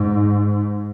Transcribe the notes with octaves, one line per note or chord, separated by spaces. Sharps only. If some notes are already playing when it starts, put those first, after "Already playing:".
Already playing: G#2